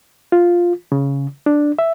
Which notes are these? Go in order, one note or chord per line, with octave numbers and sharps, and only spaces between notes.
F4
C#3
D4
E5